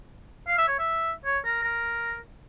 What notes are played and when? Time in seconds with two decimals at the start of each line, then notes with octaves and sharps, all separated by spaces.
0.48 F5
0.58 E5
0.68 C#5
0.79 E5
1.25 C#5
1.45 A#4
1.63 A#4